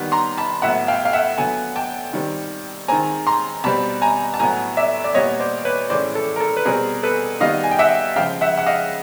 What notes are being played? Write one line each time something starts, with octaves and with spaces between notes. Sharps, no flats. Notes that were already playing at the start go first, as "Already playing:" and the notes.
Already playing: D#3 G3 B3
A#5 C6
A5 B5
A2 F#3 B3 E5 F#5
F5 G5
F5
E5 F#5
D3 F#3 B3 F#5 G#5
G5 A5
D#3 G3 C4
D#3 G#3 C4 G#5 A#5
A#5 C6
B2 G3 C4 A5 B5
G#5 A#5
A5
A2 F#3 B3 G#5 A#5
D5 E5
D5
A#2 G3 B3 C#5 D#5
C5 D5
B4 C#5
A2 E3 G#3 C#4 C5 D5
A4
A#4
A4
B4
B2 G3 C4 G#4 A#4
A4 B4
D#3 G3 B3 D#5 F5
G#5
G5
E5 F#5
C#3 F3 G#3 F5 G5
E5 F#5
F#5
D#5 F5